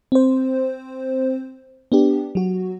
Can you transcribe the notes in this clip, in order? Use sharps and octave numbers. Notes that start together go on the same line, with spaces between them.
C4 C5
B3 D4 G4
F#3 F#4